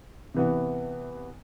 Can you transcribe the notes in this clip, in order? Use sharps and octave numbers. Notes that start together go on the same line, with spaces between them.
C3 E3 B3